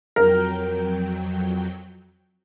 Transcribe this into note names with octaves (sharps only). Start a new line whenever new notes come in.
F2 F#3 A#4 G5